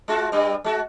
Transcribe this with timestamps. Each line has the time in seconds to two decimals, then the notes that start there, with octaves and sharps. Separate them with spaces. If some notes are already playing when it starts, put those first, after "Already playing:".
0.08 G#3 F4 F#4
0.32 G2 G3
0.64 G#3 F#4